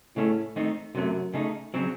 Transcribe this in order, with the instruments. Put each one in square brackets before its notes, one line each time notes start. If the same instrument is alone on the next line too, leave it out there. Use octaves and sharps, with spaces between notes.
[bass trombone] A2 [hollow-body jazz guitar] C#3 A3 C#4
[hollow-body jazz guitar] D#3 A3 C4 D#4
[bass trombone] F#2 [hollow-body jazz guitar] C3 F#3 A3
[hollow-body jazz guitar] C#3 A3 D#4
C#3 F#3 C4